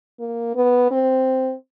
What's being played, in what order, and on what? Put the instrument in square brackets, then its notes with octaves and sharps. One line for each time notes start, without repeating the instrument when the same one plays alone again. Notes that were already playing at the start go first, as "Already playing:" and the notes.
[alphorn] A#3
B3
C4